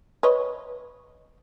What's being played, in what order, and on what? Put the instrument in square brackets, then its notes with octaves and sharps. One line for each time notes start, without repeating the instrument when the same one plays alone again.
[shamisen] B4 C#5 D#5